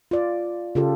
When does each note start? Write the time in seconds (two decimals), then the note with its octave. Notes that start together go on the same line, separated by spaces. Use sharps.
0.11 F4 D5
0.75 C#3 F4 G4 A4